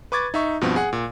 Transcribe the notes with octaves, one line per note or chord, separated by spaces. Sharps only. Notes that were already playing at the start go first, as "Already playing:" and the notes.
B4 C#6 D6 G#6 A6
D#4 E5 C#6
G2 B2 F3 B3 C4
G#4 F#5
A#2